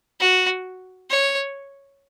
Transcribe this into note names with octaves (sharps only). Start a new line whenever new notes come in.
F#4
C#5